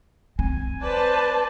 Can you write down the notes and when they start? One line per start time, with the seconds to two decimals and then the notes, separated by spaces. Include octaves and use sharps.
0.39 C4 G#5
0.82 B4 C5 D5 A5